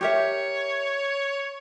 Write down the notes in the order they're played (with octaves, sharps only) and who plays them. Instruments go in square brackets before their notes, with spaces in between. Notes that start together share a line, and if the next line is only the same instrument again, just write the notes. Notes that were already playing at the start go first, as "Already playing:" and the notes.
[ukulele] G4 A#4 E5 [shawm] C#5